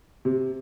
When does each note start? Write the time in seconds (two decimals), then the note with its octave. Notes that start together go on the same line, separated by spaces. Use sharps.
0.25 C3